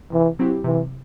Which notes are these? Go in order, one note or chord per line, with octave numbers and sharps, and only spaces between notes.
C3 E3
F#3 C4 E4 G4
C3 E3